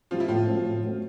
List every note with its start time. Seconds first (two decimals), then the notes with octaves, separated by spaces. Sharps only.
0.11 F3 G3 C4 F4
0.20 E4
0.28 A2 F3 F4
0.47 F#3 A3 C4
0.64 A2
0.83 F#3 A3 C4